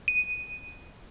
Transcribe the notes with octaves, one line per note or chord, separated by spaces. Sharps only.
D#7